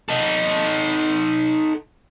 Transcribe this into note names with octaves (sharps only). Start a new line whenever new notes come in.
D#4 A4